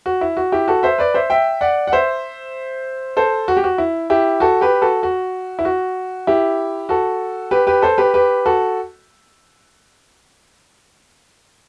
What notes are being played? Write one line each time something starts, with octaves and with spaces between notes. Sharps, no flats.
F#4
E4
F#4
E4 G4
F#4 A4
C5 E5
B4 D5
C5 E5
E5 G5
D5 F#5
F#5
C5 E5
A4 C5
F#4
G4
F#4
E4
E4 G4
F#4 A4
G4 B4
F#4 A4
F#4
E4
F#4
E4 G4
F#4 A4
G4 B4
G4 B4
A4 C5
G4 B4
G4 B4
F#4 A4